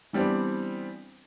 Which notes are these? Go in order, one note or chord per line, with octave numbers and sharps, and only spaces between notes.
E3 G3 B3 C4 D4